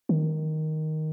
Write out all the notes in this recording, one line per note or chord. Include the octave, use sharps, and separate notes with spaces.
D#3